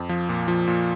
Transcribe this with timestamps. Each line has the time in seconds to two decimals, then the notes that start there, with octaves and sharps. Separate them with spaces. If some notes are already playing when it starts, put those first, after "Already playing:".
Already playing: F2
0.09 F3
0.29 A#2
0.48 F3
0.68 A#2